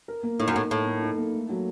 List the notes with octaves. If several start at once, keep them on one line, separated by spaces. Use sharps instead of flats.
A#4
A#3
A2 D#4
F#2
A2 A#3
A2 A#4
A#3
D#4
A#3
A3
F#3